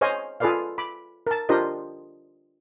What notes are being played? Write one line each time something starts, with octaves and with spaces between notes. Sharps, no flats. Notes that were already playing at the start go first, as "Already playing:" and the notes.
G#4 C5 C#5 D#5 F5 G#5
F4 G#4 A4 B4 D5 F5
B5 D6
A#4 A5
D4 F4 G4 A#4 C5 D#5